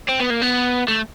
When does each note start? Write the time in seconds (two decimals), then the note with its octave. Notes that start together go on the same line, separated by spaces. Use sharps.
0.09 C4
0.20 B3
0.31 A#3
0.42 B3
0.88 A3